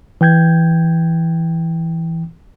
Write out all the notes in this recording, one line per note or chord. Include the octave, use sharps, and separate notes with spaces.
E3 G5 G6 G#6